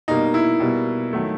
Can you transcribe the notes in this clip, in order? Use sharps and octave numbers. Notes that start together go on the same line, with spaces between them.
B2 G3 A#3 D#4
E4
B2 G3 A#3
D#3 F#3 A3